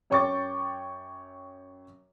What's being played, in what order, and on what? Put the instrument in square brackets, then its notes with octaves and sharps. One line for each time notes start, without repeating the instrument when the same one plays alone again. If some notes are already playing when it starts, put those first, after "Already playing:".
[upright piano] F#2 C#5 G5 C#6 D6 A6